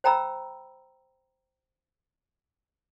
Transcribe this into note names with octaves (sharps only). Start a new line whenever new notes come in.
C5 G5 A#5 B5 E6